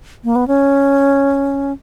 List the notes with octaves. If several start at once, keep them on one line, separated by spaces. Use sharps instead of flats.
A#3
B3
C#4